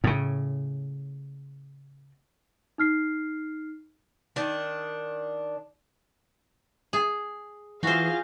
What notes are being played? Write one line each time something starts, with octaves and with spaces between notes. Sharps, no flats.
A2 C#3
D#4 F6 C7
D#3 D4
G#4
E3 F4 F#4 G#4 C5 F5